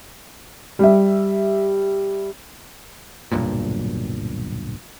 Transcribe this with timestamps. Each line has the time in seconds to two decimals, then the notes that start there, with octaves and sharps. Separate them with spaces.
0.79 G3 E5
3.32 D1 B1 G2 A#2